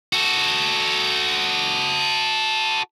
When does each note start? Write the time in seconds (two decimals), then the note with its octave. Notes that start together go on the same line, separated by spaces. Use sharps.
0.13 F#4 A4